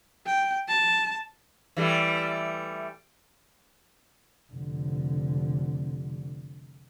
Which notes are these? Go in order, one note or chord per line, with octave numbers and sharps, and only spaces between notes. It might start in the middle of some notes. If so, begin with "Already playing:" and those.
G5
A5
E3 G3 A3
F1 D3